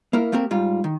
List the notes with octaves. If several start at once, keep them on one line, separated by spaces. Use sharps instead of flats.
A#3 E4 A#4
A3 A#3 C4 G4 A#4
G#2 G3 F4
D#3